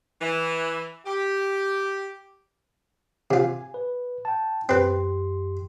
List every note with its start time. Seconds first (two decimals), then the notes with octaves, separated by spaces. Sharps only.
0.21 E3
1.06 G4
3.31 C3 F4 G#5
3.74 B4
4.25 G5 A5
4.69 F#2 C4 G4 B4 C6